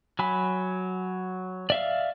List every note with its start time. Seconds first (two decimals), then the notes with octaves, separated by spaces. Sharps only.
0.19 F#3 G#5 B5
1.70 D5 E5 F5